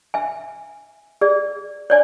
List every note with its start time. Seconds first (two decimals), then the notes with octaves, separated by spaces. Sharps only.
0.14 E5 G#5
1.21 G#4 D5
1.90 C#5 D5 G#5